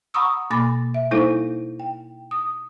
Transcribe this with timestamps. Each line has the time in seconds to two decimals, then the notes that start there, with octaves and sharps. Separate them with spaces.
0.14 F#5 A#5 B5 C#6 D#6 E6
0.51 B2 A#3 B5 D6 A6
0.94 E5
1.11 G3 A#3 D#4 E4 A4 C5
1.80 G5
2.31 D#6